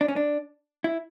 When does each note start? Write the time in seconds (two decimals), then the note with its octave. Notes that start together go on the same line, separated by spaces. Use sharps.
0.01 D4
0.08 C#4
0.16 D4
0.84 E4